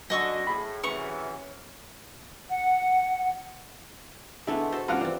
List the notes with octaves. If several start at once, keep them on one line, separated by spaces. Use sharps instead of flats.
F#2 D3 F#4 D#5 C#6 E6
A2 G#4 B5
F#2 C3 E3 C#4 C#6
F#5
D3 G#3 A3 B3 E4
F#4 A4 C5
G2 F3 F5 F#5 A#5 D6
E3 G3 C4